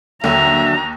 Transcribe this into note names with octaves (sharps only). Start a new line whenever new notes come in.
D#2 D3 F#3 E5 A#5